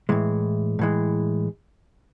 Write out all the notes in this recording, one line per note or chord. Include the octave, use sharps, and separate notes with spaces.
A2 E3 G#3
A2 E3 G#3